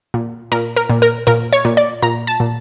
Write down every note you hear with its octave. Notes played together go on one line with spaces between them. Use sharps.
A#2
A#2 A#4
A#4
A#2
A#4
A#2 A#4
C#5
A#2
D5
A#2 A#5
A5
A#2